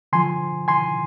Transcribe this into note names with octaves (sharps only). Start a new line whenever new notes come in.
D3 F3 G#5 C6
G#5 C6